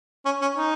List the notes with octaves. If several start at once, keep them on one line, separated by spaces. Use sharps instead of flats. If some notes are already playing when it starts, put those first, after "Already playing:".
C#4
C#4
D#4